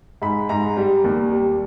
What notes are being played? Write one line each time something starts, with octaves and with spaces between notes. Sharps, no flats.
G#2 B5
G#2 A#5
G3
D#2
G3